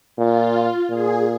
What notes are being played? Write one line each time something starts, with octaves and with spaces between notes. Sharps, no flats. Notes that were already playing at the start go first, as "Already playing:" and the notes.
A#2 F4
A#2 G#4